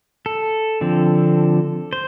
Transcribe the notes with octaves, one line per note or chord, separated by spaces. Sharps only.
A4
D3 F3 C4
C5